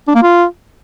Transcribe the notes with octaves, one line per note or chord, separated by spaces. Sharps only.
D4
A#3
F4